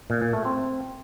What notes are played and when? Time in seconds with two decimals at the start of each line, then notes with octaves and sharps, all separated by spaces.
0.10 A#2
0.22 A#2
0.33 A3
0.45 C4